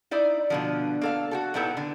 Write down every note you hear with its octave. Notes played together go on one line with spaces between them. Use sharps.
D#4 E4 D5
B2 D3 F3
A#3 A4 F5
F#4 G4 A4
A#2 G3 B3 D#4 E4 A4
D3